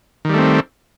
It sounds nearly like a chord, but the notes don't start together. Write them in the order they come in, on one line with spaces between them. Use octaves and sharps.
D#3 G3 A3 C4